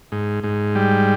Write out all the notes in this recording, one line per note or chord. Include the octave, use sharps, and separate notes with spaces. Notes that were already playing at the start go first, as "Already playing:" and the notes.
G#2
G#2
G3